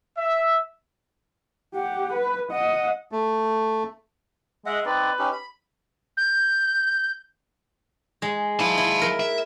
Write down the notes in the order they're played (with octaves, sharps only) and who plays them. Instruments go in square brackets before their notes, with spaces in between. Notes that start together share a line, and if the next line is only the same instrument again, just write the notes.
[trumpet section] E5
[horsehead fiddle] G4 F#5
B4
D#5 F#5
[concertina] A3
[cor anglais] G#3 [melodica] D#5 E5 F#5
[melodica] C4 D#4 D5 [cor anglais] B4
[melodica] C#4 D#4 G4
B5
[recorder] G6
[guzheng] G#3
[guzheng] E4 [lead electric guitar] F5 A5
[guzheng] E4
A#4
[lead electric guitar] E5